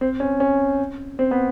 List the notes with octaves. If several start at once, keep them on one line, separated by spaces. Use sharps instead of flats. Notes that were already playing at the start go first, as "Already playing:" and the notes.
C4
C#4
C#4
C4
B3